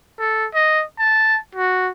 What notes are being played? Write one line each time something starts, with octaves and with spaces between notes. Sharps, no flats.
A4
D#5
A5
F#4